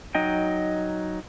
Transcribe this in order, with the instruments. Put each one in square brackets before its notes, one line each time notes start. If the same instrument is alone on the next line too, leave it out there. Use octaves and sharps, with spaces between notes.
[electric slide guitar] F#3 D#4 D#5 G5